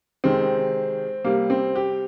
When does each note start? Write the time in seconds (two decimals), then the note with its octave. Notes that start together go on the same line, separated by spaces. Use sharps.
0.24 C3 D#3 G#3 C4
1.24 C3 G3 A#3
1.50 C4
1.76 G4